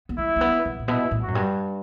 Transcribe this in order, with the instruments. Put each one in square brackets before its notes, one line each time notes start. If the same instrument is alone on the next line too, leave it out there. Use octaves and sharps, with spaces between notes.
[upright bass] B3
[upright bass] A3 [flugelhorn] E4
[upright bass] A3
B3
C3
A2
[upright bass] B2 [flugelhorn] E4
[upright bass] A2
[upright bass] F#2 [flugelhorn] F#4
[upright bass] G2